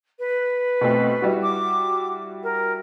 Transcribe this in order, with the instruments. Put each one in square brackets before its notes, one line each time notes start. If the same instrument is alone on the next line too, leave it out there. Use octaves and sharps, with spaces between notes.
[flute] B4
[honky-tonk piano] B2 A3 C4
G3 E4 F#4
[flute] D6
A#4